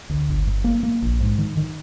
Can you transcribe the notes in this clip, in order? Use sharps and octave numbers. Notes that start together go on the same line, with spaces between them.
D2
G1
G2
A#3
A#3
A#1
G#2
D#3
D#3